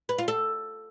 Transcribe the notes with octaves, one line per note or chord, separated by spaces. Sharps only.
B4
F4
A4